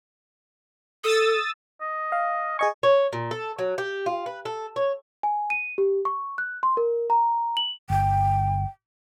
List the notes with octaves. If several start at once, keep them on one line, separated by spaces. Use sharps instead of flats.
A4 D#6 E6 A6
D#5
F5
G#4 D#5 G#5 C#6
C#5
A#2
A4
F#3
G4
F4
B4
A4
C#5
G#5
D#7
G4
C#6
F#6
C6
A#4
A#5
F#7
G1 G5